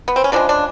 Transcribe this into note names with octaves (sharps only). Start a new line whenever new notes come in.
B3
C4
C#4
C#3 F3 G#3 D4
D4